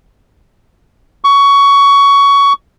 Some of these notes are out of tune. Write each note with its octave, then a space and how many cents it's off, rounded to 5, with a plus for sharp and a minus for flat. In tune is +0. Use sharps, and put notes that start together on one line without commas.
C#6 +15